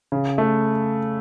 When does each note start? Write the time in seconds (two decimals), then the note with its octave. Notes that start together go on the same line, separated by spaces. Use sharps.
0.12 C#3
0.38 A3